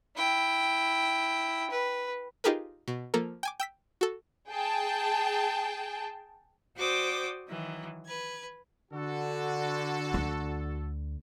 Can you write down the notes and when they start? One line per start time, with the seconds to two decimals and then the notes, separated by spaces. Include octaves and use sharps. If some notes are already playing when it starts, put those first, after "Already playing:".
0.16 E4 G5
1.70 B4
2.44 D#4 F4 G4 G#4 A#4 B4
2.88 B2
3.14 F3 A#3 A4 A#4
3.43 G5 G#5 D6
3.60 G5 E6 B6
4.01 F#4 A4
4.49 G#4 G5 A5
6.78 F#4 C5 D5 G5 D6 D#6
7.48 D#3 E3 F#3
8.05 B4 G#6
8.92 D3 F#4 A4
10.14 D2